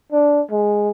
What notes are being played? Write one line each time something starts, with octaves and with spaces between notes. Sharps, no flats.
D4
G#3